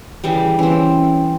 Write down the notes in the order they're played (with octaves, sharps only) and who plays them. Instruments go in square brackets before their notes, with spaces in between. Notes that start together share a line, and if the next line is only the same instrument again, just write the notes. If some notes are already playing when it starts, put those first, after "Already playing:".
[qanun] C#3 E3 G3
[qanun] E3 C4 [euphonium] C#4